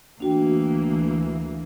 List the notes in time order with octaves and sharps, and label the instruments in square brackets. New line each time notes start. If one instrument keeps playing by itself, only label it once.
[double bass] D2 E3 [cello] A#3 [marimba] D4 F#4 G5